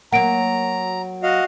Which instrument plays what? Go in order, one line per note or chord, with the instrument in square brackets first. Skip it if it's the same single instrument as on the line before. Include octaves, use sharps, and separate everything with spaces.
[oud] F#3 A#3 [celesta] F#5 D7 [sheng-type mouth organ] A#5
[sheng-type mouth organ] F#4 D#5 F5